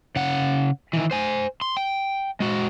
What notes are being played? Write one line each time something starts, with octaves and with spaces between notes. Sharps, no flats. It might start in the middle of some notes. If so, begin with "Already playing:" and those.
C#3 F#5
D#3 E3
C5 G#5
C6
G5
G#3 F#4